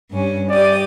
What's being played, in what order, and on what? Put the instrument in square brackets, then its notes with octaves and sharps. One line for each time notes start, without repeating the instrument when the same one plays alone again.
[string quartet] G2 C#4
[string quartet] G4 D#6 [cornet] D5